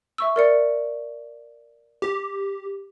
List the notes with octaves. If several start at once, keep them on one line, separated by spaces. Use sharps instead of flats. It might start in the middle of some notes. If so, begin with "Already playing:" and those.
E5 C#6 E6
A#4 D5 C#7
G4